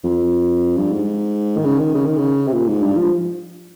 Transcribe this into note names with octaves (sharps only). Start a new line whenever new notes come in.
F2
G2
G#2
D#3
C#3
D#3
C#3
D#3
C#3
C3
A#2
G#2
G2
F3